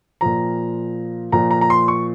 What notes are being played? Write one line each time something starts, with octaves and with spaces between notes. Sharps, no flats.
A#2 F3 A#5
A#2 F3 A#5
A#5
A#5
C6
C#6